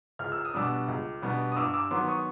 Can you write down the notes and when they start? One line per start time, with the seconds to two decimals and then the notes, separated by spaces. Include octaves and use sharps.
0.19 C#2 F6
0.32 E6
0.45 D#6
0.54 B2 G3 B3 D4 D6 E6
0.88 C#2
1.22 B2 G3 B3 D4
1.52 D#6
1.56 G2 D6 E6
1.74 D6 E6
1.91 D#3 F#3 B3 C6 D6
2.08 C#6 D#6